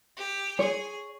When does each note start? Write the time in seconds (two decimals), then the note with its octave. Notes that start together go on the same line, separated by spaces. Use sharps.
0.17 G4
0.59 G#4 C#5